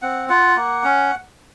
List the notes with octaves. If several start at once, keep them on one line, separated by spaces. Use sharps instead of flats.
C4 F#5
F4 F#5
A#3
C#4